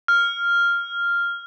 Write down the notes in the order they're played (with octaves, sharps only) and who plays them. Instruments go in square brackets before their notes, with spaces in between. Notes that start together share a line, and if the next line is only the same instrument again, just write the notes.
[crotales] F6